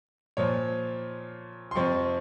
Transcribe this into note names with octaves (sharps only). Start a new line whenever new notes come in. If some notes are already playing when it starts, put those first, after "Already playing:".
A#2 F3 C#5
C6
F2 C3 F3 C#6